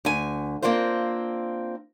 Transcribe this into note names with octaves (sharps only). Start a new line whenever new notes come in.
D2 G#5
A#3 C4 D4 F4 C5